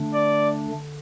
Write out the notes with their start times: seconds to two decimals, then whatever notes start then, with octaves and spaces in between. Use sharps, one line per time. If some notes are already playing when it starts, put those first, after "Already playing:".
Already playing: D3 A3 D4
0.14 D5
0.71 D3